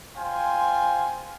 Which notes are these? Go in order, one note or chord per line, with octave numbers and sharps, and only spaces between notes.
F4 C5 G5 G#5